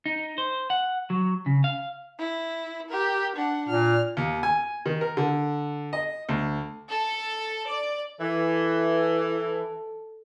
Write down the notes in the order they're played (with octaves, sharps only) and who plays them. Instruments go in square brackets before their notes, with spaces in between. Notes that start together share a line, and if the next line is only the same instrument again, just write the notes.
[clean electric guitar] D#4
C5
F#5
F#3
C#3
F5
[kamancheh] E4
G4 A#4
D4 F#5
[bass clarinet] A#2 [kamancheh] F6
[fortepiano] D#2
G#5
D#3
A#4
D3
D#5
D2
[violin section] A4
D5
[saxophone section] E3 [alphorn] A4